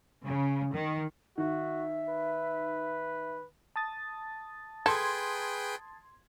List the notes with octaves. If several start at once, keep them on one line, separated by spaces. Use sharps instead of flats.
C#3
D#3
D#3 F#4 E5
B4
A5 D#6 A6
G#4 A4 B4 G5 C6 G#6